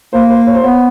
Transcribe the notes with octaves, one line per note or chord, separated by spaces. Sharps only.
A#3 C5
C5
C#5
C5
B3 C#5